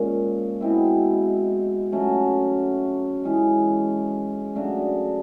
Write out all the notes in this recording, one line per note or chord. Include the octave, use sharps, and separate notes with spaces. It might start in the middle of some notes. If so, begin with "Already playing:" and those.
Already playing: A#2 F3 G#3 C#4
B2 G#3 C4 E4
F#3 A3 C#4
E3 G#3 C#4
C#3 F#3 A3 D4